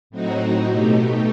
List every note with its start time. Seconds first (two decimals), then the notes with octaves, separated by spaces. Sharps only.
0.10 A2 F#3 C4 D#4 F#4
0.68 B2 A3 D#4 G4